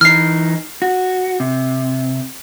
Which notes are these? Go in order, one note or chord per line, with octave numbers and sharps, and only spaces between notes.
E3 D#4 F6 C7
F#4
C3